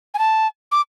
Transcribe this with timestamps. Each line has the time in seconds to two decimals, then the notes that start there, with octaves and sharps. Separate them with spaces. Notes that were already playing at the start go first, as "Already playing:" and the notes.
0.14 G#5
0.19 A5
0.72 D6